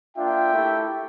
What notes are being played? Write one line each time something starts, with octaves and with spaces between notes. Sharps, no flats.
A#3 D4 F4 E5 G5
A3 E4 G4